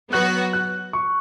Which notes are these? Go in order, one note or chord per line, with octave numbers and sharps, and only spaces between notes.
F#3 B3 F#4 F#6
F#6
C#6